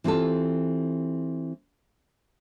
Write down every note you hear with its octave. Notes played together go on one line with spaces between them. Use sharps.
E3 C4 F4 G4 A4